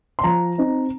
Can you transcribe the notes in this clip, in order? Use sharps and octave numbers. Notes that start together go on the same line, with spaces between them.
C6
F3 A#5
C4 D#4